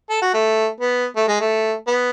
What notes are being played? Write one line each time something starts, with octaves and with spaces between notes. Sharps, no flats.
A4
F#4
A3
B3
A3
G#3
A3
B3